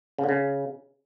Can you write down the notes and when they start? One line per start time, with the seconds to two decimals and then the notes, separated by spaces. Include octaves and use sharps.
0.19 C#3
0.24 D3
0.29 C#3